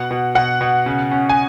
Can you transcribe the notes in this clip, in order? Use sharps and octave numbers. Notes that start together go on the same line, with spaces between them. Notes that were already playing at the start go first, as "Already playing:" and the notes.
Already playing: B2 F#5
B2
B2 F#5
B2
C#3
C#4
G#5